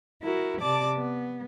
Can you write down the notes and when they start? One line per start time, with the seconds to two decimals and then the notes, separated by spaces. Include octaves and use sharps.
0.22 E4 F#4 A#4
0.60 C3 D5 A5 D6
0.97 B3